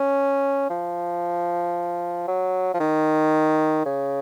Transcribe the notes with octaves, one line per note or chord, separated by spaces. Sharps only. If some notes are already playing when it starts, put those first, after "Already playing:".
Already playing: C#4
F3
F#3
F3
D#3
C#3